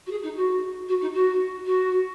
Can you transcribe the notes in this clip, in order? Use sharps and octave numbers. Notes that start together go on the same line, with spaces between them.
F#4
G#4
D#4
F#4
F#4
D#4
F#4
F#4